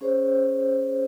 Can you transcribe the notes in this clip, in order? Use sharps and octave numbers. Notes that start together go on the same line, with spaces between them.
C#4 G#4 C5 C#5